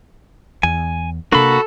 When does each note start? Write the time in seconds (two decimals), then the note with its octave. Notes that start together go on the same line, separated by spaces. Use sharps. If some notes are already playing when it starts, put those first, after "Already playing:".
0.63 E2 G#5
1.32 C3 A#3 D4 F#4 A4 B5